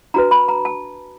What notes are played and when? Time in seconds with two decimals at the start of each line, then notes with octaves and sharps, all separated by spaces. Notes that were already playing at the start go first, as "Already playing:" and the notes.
0.14 D4 F#4 B4 A#5
0.31 B5
0.48 A#5
0.65 A5